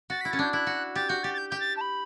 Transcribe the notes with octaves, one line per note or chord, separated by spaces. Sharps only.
F#4 A6
B6
E4
C#4 A6
D4 G6
E4 F#6
F#4
G4 A6
F#4 G6
G4 A6
A6
G6
G4 G6
A6
A5
B5